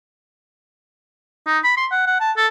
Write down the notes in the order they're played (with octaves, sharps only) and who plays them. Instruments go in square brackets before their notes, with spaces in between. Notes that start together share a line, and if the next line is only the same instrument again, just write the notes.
[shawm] D#4
B5
C6
F#5
F#5
A5
A4